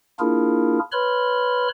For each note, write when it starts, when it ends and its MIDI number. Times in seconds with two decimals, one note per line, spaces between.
0.20 0.79 58
0.20 0.79 62
0.20 0.79 64
0.20 0.79 65
0.20 0.79 68
0.20 0.79 70
0.92 1.68 71
0.92 1.68 73
0.92 1.68 83
0.92 1.68 84
0.92 1.68 89